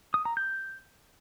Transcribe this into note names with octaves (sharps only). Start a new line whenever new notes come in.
D#6
A#5
G6